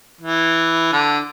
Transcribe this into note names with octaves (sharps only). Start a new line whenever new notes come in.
E3
D3